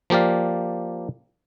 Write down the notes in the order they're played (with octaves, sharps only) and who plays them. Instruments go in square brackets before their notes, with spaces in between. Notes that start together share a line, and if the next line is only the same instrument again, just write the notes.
[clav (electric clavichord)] F3 A#3 G4 D5 F5